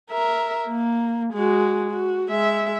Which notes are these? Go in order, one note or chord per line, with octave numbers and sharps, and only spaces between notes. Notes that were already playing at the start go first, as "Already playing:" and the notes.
A#4 E5
A#3
G#3 F#4
F#4
G#3 E5